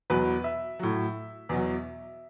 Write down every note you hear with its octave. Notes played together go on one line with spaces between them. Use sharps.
E2 B2 F#3 B4
E5
A2 F#3
E2 B2 F#3